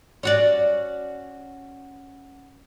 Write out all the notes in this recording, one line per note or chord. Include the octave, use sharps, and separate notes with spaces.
C#4 F#4 D5